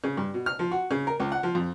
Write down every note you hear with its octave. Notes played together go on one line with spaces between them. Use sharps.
C#3
G2
B2
F6
F3
F#4
C#3
A#4
C#2
F#5
F3
F2